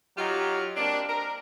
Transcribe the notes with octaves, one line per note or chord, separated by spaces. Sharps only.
F#3 D#4 F4 G4
A#3 C4 D4
A#4